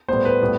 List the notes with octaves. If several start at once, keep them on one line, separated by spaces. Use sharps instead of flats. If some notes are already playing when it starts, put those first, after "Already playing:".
A2 G3 B3 C5
B4
A2 G3 B3